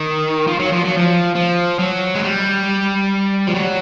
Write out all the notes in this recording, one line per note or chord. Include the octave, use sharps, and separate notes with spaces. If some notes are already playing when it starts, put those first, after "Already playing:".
Already playing: D#3
F3
F#3
F3
F#3
F3
F3
F#3
G#3
G3
F3
F#3